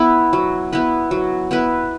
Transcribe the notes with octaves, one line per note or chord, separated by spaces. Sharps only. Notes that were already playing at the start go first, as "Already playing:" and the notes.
Already playing: B3 E4 B4
F#3
B3 E4 B4
F#3
B3 E4 B4